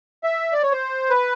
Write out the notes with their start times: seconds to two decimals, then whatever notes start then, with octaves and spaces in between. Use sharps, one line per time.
0.23 E5
0.52 D5
0.63 C#5
0.72 C5
1.10 B4